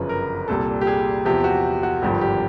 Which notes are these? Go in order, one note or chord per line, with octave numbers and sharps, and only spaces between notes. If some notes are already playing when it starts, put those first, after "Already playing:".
Already playing: G1 F#2 C#3 F3 B4
A#4
C2 A#2 G3 A4
G4
G#4
E2 C3 F3 G4
F#4
F#4
G#1 G2 D3 F3 G4
G4